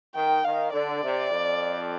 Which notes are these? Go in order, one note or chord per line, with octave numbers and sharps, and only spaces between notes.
D#3 G5
D#3 F5
D3 D5
C3
F2